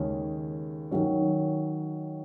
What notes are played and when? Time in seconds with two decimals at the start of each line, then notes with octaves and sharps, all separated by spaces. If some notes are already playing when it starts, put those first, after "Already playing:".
Already playing: D#2 C#3 G#3 C#4
0.91 D#3 F#3 C#4